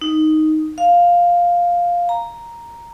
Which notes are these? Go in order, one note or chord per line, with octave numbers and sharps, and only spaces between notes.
D#4
F5
A#5